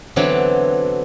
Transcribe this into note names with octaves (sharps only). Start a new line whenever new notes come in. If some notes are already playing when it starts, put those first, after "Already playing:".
D3 E3 F#3 B3 C4 D4